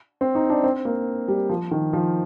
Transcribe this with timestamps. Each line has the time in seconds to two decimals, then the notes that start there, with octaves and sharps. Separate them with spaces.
0.21 C4
0.35 D#4
0.50 D4
0.64 C4
0.85 A#3
1.28 G3
1.50 F3
1.71 D#3
1.93 F3